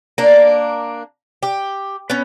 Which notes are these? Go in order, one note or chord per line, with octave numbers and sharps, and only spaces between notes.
A#3 D4
G4
B3 C#4